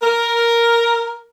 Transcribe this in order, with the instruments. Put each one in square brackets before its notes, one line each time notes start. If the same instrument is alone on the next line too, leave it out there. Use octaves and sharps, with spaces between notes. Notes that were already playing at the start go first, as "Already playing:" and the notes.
[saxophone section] A#4